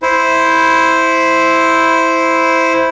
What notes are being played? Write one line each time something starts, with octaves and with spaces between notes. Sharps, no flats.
E4 C5